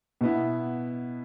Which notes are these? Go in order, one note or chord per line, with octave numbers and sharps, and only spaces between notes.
B2 B3 E4